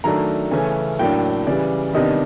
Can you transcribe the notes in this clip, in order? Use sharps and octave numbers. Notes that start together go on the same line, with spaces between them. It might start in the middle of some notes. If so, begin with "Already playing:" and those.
D#3 F#3 A3 D4 A#5
C#3 E3 A3 C#4 G#5
A2 F#3 A#3 D4 G5
C#3 E3 G3 D5
C3 D#3 G3 B3 D4 D#5